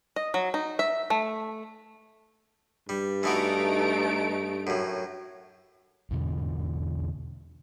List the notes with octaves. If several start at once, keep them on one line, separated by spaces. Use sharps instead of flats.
D#5
F#3
D#4
E5
A3
G2 G3
E3 A3 B3 D#4 F#4 D7
F#2 A2
E2 B2 D3